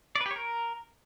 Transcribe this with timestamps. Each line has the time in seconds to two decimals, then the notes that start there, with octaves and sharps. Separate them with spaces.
0.16 D5
0.21 B4
0.26 G4
0.31 C#5
0.36 A#4